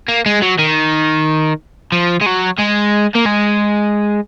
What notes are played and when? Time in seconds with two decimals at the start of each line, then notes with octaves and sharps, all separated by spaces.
0.08 A#3
0.26 G#3
0.42 F#3
0.59 D#3
1.92 F3
2.21 G#3
2.26 F#3
2.59 G#3
3.15 A#3
3.26 G#3